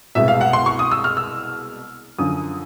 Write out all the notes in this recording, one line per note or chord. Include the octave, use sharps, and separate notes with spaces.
C2 B2 G#3 E5
F5
F#5
C6
C#6
D#6
E6
F6
E6
F#2 D3 F3 D#6